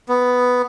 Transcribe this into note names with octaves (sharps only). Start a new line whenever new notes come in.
B3